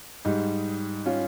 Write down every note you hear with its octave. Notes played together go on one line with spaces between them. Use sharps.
G#2 G3 D#4
C#4 F4